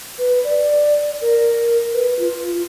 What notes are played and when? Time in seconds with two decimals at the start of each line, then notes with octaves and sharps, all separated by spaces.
0.18 B4
0.44 D5
1.22 A#4
1.94 B4
2.19 F4